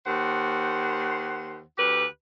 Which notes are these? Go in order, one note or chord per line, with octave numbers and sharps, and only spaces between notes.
D#2 C5 F#5
D2 G4 B4